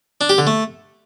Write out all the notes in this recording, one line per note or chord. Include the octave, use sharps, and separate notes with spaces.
D4
G4
D3
A3